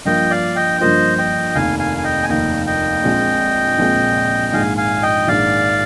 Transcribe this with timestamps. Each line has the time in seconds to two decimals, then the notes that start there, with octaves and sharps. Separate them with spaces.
0.05 G2 F3 A#3 F4 D#5 G5
0.30 D5 F5
0.56 D#5 G5
0.80 G2 F3 A#3 F4 C5 D#5
1.18 D#5 G5
1.55 F1 D#2 D#3 F5 G#5
1.79 F5 G#5
1.98 G#5
2.04 D#5 G5
2.23 G#5
2.29 F1 D#2 D#3 D#5 G5
2.66 D#5 G5
3.04 A#1 A#2 G#3 C4
3.78 A#1 A#2 G#3 C4
4.53 A#1 G#2 D#3 F5 G#5
4.77 F5 G#5
5.02 D#5 G5
5.27 A#1 G#2 D#3 D5 F5